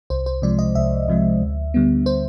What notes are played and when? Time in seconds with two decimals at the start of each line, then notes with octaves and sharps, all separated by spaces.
0.10 C2 C5
0.26 C5
0.42 C3 F3 G#3 D5
0.59 D#5
0.75 C2 E5
1.08 C3 F3 G#3
1.41 D2
1.74 D3 G3 B3
2.06 C5